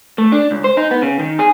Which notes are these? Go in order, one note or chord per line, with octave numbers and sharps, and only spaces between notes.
A3
D4
C#2
C5
D#4
B3
C#3
D#3
G#4